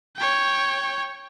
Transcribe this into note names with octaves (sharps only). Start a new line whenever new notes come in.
C#5 G5